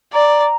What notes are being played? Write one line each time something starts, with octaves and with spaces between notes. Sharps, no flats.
D5 A#5